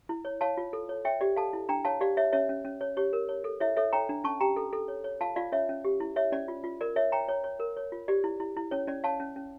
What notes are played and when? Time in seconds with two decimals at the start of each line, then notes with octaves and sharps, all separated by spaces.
0.09 E4
0.25 C#5
0.41 C#5 F5 A5
0.57 F4
0.73 A4
0.89 C#5
1.05 C#5 E5 G5
1.21 G4 D5
1.36 A4 F5 A5
1.53 E4
1.69 D4 G5 A#5
1.85 C#5 F5 A5
2.01 G4 D5 F5
2.17 C#5 E5
2.33 C#4 C#5 E5
2.49 C#4
2.65 C#4
2.81 C#5
2.97 G4 C#5
3.13 A#4
3.29 C#5
3.44 A4
3.60 E4 C#5 E5
3.76 A4 C#5 E5
3.93 C#5 G5 A#5
4.09 D4
4.24 C#4 A5 C#6
4.40 G4 G5 A#5
4.56 A4
4.73 A4
4.88 C#5
5.04 C#5
5.21 F4 F5 A5
5.36 F4 D5 F5
5.52 C#4 C#5 E5
5.69 C#4
5.84 G4
6.00 E4
6.16 C#5 E5
6.32 C#4 D5
6.48 F4
6.64 F4
6.81 A#4 D5
6.96 C#5 E5
7.12 C#5 G5 A#5
7.28 C#5
7.44 C#5
7.60 A#4
7.77 C#5
7.92 F4
8.08 G4 D5
8.24 E4
8.40 E4
8.57 E4
8.71 C#4 C#5
8.87 C#4 D5
9.04 C#5 F5 A5
9.20 C#4
9.36 C#4